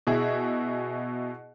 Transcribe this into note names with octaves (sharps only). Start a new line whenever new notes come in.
B2 E4 G#4